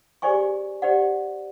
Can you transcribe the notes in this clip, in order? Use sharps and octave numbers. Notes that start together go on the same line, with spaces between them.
G4 G#4 C5 D5 G#5 C#6
G4 C5 D5 F#5